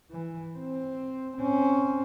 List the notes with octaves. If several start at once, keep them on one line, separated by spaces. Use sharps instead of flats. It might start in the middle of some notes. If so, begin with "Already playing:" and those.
E3
C4
C4 C#4